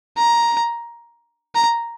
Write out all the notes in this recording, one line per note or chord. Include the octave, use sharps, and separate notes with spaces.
A#5
A#5